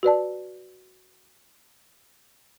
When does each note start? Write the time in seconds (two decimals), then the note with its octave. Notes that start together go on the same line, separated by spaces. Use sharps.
0.03 F#4 B4 D5 A5